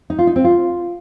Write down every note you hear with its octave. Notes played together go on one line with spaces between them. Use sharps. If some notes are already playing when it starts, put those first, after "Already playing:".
D#4
F4
D#4
C4
F4